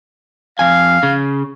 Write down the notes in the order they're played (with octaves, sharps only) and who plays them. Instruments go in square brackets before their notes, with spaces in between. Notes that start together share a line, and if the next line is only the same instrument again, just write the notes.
[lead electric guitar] F2 G#5 [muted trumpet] F5
[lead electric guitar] C#3